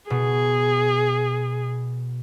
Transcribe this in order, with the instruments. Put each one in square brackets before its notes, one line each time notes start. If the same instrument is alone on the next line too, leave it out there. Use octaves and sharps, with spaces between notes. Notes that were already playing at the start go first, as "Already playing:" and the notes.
[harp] B2 [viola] G#4